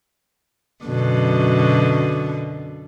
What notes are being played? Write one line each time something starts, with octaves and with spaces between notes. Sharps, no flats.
F#2 B2 D3